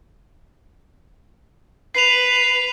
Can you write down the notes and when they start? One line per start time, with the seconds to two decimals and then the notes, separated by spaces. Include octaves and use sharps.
1.95 B4 C7 F7